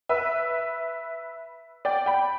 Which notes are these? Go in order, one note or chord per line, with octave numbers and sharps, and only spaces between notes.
B4 E5
D5 G5
G5 B5